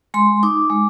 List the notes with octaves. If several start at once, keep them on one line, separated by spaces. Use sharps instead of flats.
G#3 C6
D#4 D6
G#3